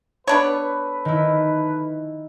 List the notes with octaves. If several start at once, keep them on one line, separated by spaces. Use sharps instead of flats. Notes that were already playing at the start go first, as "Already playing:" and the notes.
B3 D4 A4 B4 C#5
D#3 E4